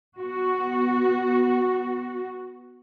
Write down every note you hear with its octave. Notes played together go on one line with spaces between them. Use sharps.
B3 F#4